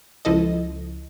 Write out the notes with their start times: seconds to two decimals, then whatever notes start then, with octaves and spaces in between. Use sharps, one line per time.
0.25 C#2 F3 E4 A4 D#5